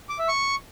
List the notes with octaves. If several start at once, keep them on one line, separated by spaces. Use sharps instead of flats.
D6
E5
C#6